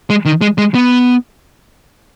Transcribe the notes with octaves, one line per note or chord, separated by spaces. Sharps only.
G#3
D#3
G#3
G#3
B3